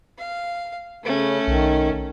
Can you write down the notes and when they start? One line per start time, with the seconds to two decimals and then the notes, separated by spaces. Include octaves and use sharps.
0.18 F5
1.04 C#3 A3 C#4
1.47 B1 D#3